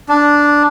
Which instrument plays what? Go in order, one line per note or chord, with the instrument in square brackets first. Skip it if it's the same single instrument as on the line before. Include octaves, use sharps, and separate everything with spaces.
[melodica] D4